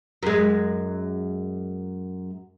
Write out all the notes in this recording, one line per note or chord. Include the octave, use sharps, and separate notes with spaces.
F#2 G#3